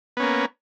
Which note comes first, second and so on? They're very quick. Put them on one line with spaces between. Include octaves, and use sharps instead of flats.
B3 C#4 A#3